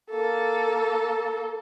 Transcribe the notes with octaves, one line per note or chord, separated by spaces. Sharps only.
A#3 A4